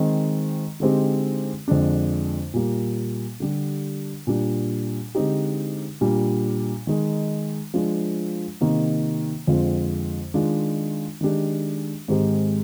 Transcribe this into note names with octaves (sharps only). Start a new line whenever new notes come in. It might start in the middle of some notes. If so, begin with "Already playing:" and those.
Already playing: D#3 G#3 C4
D3 G#3 C4 D#4 G4
F2 D3 G#3 D4
A#2 G3 A#3
D3 G3 D4 G4
A#2 G3 D4
D3 G#3 C4 D#4 G4
A#2 G3 D4
D#3 G#3 D#4
F3 G#3 D4 F4
C3 D#3 A#3 D#4
F2 D3 G#3 C4 F4
D#3 G#3 D4 F4
D#3 G#3 D4 G4
G#2 D#3 G#3 C4 G4